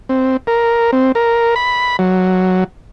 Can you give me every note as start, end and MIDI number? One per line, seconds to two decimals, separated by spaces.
0.09 0.37 60
0.47 0.91 70
0.93 1.12 60
1.15 1.55 70
1.56 1.97 83
1.99 2.64 54